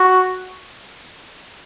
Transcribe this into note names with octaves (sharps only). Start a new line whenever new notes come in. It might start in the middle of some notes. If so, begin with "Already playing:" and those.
Already playing: F#4